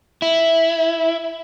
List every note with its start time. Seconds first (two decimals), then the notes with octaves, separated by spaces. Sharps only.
0.22 E4